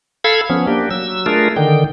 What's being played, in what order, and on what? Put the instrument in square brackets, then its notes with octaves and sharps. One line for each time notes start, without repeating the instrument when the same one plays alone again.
[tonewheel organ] A4 F5 B5 E6 G#6
F3 B3 C#4
A#3 D4 G4
F#3 E6
A3 D4 F4 G#4 A#4
D3 D#3 G5